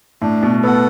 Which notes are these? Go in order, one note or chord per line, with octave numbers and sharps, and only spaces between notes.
A2 D4
B2
B3 A4 F#5